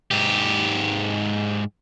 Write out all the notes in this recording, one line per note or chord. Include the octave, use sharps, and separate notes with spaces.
G#2 G4